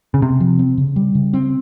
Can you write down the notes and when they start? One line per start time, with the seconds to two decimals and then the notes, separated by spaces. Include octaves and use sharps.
0.14 C#3
0.22 C3 C4
0.40 F3
0.59 C4
0.78 C#3
0.96 G3
1.15 C#3
1.33 C4